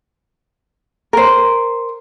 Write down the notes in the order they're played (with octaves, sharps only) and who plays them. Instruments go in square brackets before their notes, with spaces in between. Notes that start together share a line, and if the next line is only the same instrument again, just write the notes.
[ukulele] A#4 C5